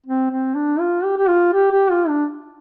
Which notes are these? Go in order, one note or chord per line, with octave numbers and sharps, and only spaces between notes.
C4
C4
D4
F4
G4
G4
F4
G4
G4
F4
D4